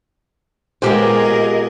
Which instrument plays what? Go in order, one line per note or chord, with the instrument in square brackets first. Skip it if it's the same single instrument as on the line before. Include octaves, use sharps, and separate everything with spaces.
[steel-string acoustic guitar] A#2 G#3 B3 [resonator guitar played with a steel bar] G4 C5 [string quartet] G#4 A#4 D#5